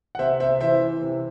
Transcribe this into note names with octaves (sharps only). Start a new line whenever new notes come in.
F#5
C3 C5 E5
C3 C5 E5
E3 C5 E5
E3
C3